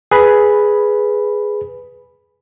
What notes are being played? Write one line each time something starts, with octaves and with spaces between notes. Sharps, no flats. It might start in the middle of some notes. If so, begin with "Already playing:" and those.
G#4 B4 B5